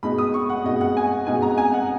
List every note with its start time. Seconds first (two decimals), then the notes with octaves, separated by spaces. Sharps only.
0.03 B2 G#3 D#4 B5
0.18 D#6
0.34 C#6
0.49 F#5
0.64 B2 G#3 D#4 D#5
0.81 F#5
0.97 G#5
1.26 B2 G#3 D#4 G#5
1.42 A#5
1.58 G#5
1.74 F#5